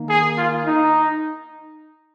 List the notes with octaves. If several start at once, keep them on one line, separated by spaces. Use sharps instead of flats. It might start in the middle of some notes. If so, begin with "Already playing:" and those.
Already playing: D#3 A#3
G#4
F4
D#4